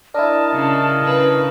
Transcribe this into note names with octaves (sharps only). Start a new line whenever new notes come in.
D4 E4 A#4 D#5 A5
C#3
C#3 B4